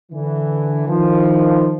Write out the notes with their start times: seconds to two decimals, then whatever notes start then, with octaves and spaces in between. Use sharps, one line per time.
0.12 D3 E3
0.87 D#3 F3